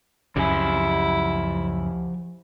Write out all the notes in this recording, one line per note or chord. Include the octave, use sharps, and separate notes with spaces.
C#2 F#2 C#3 F3 E4 G4 G#5